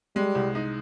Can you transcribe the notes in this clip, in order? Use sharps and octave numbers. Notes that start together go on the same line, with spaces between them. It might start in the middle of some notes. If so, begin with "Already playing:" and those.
G3 G#3
C2
D#4